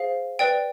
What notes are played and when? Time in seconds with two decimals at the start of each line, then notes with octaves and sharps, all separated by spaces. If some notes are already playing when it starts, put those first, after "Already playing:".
Already playing: G#4 C5 F5
0.39 B4 D5 G5